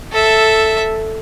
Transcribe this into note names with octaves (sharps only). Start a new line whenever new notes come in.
A4 E5